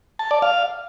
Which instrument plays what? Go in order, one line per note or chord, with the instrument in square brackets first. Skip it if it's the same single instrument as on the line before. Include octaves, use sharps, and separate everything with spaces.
[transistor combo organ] A5
D5
F5